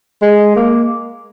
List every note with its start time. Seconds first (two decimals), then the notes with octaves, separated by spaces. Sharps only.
0.22 G#3
0.56 A#3